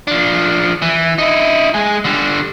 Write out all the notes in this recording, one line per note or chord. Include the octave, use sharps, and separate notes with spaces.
F3 D4
E3
D#4 E4
G#3 G#5
D3 G3